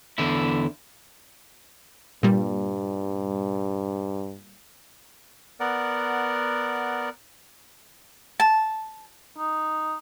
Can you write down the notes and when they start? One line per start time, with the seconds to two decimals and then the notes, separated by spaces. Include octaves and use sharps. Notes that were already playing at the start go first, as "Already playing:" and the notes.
0.18 E2 D3 E4
2.23 G2 A#2 G3
5.60 B3 A#4 D5 F#5
8.40 A5
9.38 D#4